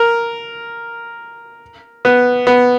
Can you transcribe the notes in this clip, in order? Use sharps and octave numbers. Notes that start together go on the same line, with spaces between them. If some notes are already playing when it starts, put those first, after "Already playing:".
Already playing: A#4
B3
B3